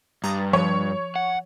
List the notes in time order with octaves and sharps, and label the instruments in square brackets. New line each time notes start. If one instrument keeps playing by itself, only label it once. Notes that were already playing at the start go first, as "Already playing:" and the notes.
[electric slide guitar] G2 [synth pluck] A#5 D#6 A6
[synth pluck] F3 [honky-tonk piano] C#5
[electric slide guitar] F#5